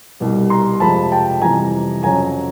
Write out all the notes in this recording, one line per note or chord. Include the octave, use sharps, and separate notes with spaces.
C2 B2 G3
A#5 C6
F2 C3 F3 G#3 A5 B5
G5 A5
F2 C3 E3 G3 G#5 A#5
F2 C#3 F#3 G#5 A#5